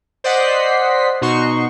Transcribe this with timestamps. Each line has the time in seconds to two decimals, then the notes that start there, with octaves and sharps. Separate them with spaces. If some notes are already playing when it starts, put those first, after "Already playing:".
0.24 C5 D5 D#5 F#5 B6 C7
1.21 B2 D#4 F#4 C6 C#6